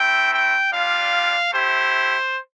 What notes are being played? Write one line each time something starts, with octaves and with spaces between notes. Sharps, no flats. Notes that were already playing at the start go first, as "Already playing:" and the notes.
Already playing: A3 C4 E4 G5
G5
G3 D4 F4 F5
A3 E4 G4 C5